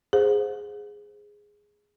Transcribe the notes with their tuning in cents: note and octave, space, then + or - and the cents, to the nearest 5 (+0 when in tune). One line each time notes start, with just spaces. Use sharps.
G#4 -5 C5 +0 F#5 -45